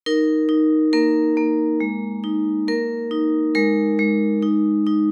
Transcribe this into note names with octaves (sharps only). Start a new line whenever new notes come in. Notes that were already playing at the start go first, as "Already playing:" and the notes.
D#4 A#4
D#4
A#3 A#4
A#3
G#3
D#4
A#3 A#4
D#4
G#3 A#4
G#3
D#4
D#4